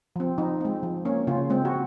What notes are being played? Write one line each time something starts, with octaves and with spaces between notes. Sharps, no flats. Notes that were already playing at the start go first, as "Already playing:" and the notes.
F3 C4
F3 D#4
G#3 C4
F3
A#3 C#4
C#3 C#4 F4
G#3 C4
F#4